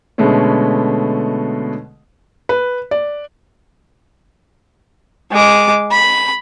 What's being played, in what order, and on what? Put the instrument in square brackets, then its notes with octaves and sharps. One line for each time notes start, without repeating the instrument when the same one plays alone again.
[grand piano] B2 D3 G#3 A3 B3 C#4
[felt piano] B4
D5
[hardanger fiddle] G#3 D6
B5